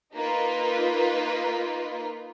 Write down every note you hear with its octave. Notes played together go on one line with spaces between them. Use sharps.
A#3 D#4 F4 B4